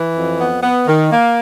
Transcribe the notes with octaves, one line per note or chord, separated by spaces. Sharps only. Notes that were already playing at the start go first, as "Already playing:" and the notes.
Already playing: E3
F2
B3
B3
D#3
A#3